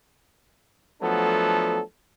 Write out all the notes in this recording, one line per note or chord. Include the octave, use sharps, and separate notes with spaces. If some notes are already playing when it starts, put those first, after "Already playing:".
F3 F#3 A3 B3 D4 A4